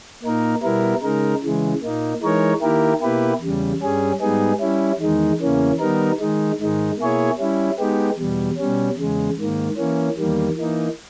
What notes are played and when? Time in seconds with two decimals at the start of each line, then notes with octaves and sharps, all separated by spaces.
0.23 A#2 A#3 D#4 A#4
0.63 B2 G3 B3 E4 A#4
1.02 C#3 G#3 D#4 A#4
1.42 C#3 E3 G#3
1.81 A#2 A#3 D#4
2.22 E3 G#3 D#4 A#4 C#5
2.62 D#3 A#3 E4 G4 A#4
3.01 B2 A#3 E4 G4 B4
3.41 E2 C#3 G3
3.80 G2 G3 C#4 G#4
4.21 G#2 G3 B3 D#4 G#4
4.60 G3 C#4 E4
5.00 E2 D#3 G#3 D#4
5.40 E2 C#3 E3 A#3 C#4
5.79 D#3 G3 B3 D#4 A#4
6.20 D#3 G#3 D#4
6.60 G#2 D#3 G#3 D#4
6.98 B2 A#3 E4 G#4 C#5
7.38 G3 C#4 E4
7.78 G#3 B3 D#4 G4
8.18 E2 B2 G3
8.58 B2 G3 C#4
8.97 E2 C#3 G#3
9.37 G#2 D#3 A#3
9.77 E3 A#3 C#4
10.18 E2 D#3 G3 A#3
10.56 E3 A#3 D#4